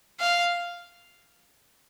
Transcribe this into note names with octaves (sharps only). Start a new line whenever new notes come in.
F5